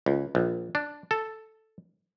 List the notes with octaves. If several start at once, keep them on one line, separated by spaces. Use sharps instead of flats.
C#2
A#1
D4
A4